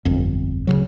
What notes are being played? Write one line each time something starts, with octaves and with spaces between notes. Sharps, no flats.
D1 G1 F2
D1 C2 C#3 F#3